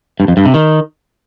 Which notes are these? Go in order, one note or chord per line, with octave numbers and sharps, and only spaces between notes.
G2
F2
G2
C3
D#3